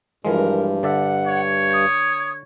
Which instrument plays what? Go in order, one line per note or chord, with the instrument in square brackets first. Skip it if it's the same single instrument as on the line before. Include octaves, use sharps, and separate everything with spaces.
[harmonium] G2 [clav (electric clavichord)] E3 F3 G#3 [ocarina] A#4
[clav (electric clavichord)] D3 D5 E5 [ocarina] F#5
[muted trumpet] C#5
[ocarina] D#6